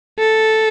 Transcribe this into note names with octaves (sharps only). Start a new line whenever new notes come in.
A4